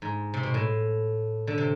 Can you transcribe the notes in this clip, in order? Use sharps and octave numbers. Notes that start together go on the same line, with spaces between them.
G#2
C3
B2
A2
D3
C3